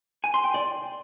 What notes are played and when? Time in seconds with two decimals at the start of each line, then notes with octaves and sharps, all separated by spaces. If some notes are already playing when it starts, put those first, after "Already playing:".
0.24 G#5
0.34 C6
0.44 G5
0.54 D5